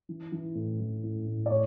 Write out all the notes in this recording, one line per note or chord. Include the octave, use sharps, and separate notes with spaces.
E3
E3
A2
E3
A2
A2
D5
A2 C#5